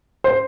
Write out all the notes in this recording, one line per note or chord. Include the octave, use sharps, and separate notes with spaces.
C5